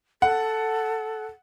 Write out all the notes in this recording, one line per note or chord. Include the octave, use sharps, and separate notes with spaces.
A4 F#5